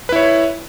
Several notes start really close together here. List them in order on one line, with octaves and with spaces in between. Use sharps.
B4 E4 C#5